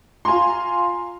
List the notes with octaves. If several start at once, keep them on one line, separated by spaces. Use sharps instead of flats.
F4 G#5 A#5 C6